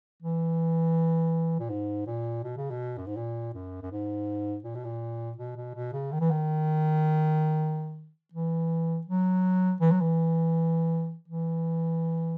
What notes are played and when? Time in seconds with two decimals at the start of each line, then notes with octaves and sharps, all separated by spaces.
0.22 E3
1.59 A#2
1.69 G#2
2.06 A#2
2.43 B2
2.57 C#3
2.70 B2
2.97 F#2
3.07 G#2
3.16 A#2
3.54 F#2
3.82 F#2
3.91 G#2
4.64 A#2
4.75 B2
4.84 A#2
5.37 B2
5.57 B2
5.74 B2
5.93 C#3
6.12 D#3
6.20 E3
6.31 D#3
8.33 E3
9.06 F#3
9.81 E3
9.91 F#3
10.00 E3
11.28 E3